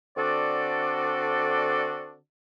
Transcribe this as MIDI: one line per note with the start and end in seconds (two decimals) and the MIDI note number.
0.17 2.16 50
0.17 2.16 60
0.17 2.16 62
0.17 2.16 66
0.17 2.16 69
0.17 2.16 74